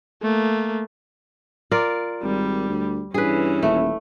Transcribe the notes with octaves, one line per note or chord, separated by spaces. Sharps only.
A3 A#3
F4 A#4 D5
G#1 G3
D2
G2 E3 C#4 G#4 B4
D#1 A3